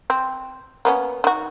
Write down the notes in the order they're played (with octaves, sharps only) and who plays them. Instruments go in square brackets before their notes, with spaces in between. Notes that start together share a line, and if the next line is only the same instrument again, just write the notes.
[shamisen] C4
A#3 B3 C#4
D#3 F#4